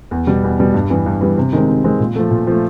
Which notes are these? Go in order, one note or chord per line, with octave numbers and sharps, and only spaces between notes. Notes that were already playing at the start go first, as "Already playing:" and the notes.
E2
B2 G3
E2
B2 G3
G2
E3 G3 B3
G2
E3 G3 B3
C3
D#3 G#3 C4
C3
D#3 G#3 C4
A#2
F3 A3
A#2
F3 A3